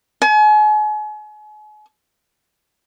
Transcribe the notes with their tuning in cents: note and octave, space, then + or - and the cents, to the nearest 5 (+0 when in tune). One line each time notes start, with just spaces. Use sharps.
G#5 +40